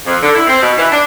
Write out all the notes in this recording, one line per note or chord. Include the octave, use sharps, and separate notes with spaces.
F2
D3
E4
C4
B2
E3
D4